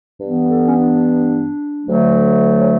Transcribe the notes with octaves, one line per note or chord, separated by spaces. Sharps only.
G2 E3 B3
A4
C#4
D4
D2 D3 F#3 A3
C#4